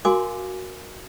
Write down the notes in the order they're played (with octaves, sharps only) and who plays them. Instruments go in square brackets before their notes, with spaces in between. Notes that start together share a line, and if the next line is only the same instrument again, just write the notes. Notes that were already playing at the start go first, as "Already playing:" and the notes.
[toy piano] F#4 A#4 F5 G#5 C6 D6